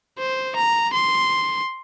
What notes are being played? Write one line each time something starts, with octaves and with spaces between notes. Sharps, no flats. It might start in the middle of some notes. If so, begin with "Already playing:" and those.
C5
A#5
C6